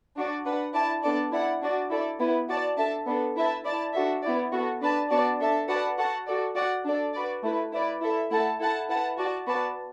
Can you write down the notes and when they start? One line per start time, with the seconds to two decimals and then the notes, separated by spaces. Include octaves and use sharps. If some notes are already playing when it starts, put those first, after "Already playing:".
0.16 D4 F#4 D5
0.45 D4 B4 F#5
0.74 E4 D5 A5
1.03 B3 D4 A4 D5 A5
1.32 E4 D5 F#5
1.62 D4 F#4 D5
1.90 E4 A4 D5
2.19 B3 E4 B4
2.49 F#4 D5 A5
2.77 D4 A4 E5 A5
3.06 B3 D4 A4
3.36 E4 B4 E5 A5
3.64 E4 D5 A5
3.93 D4 F#4 A4 E5
4.23 B3 E4 D5
4.52 B3 F#4 A4
4.81 D4 B4 D5 A5
5.10 B3 D4 F#4 D5 A5
5.40 D4 A4 E5 A5
5.68 F#4 B4 D5 F#5 A5
5.98 F#4 A4 F#5 A5
6.27 F#4 A4 D5
6.55 F#4 D5 F#5
6.84 D4 A4 D5
7.14 F#4 B4 D5
7.42 A3 E4 B4
7.72 E4 B4 D5
8.01 E4 A4 E5
8.30 A3 E4 A4 F#5 A5
8.59 E4 A4 F#5 A5
8.89 E4 B4 F#5 A5
9.17 F#4 D5 A5
9.46 B3 F#4 B4 D5 A5